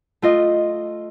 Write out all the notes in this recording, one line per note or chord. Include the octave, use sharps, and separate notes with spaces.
A3 F4 D#5